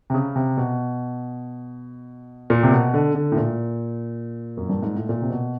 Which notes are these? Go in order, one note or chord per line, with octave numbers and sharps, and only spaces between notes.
C3
C#3
C3
B2
A#2
C3
B2
D3
D3
A2
A#2
F#2
G2
G#2
A2
A#2
C3
B2